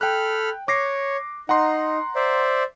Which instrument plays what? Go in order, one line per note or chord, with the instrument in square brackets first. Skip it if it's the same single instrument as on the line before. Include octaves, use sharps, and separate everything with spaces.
[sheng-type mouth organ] A4 B5 F6 [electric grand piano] G5 F#6
[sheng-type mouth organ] C#5 [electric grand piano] D6 A#6 C7
[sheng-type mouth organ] D#4 [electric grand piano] F#5 A#5 C6
[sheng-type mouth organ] C5 D5 E5